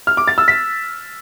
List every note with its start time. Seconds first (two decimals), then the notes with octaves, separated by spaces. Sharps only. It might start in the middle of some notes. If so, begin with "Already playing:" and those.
0.07 F6
0.17 D6
0.28 A6
0.38 E6
0.48 B6